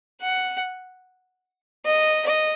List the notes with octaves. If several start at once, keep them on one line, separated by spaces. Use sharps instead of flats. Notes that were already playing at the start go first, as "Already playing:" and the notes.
F#5
D#5
D#5